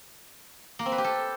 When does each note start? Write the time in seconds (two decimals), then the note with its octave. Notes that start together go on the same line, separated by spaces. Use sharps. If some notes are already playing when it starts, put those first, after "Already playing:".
0.79 A#3
0.86 C4
0.92 B4
0.98 G4
1.04 A4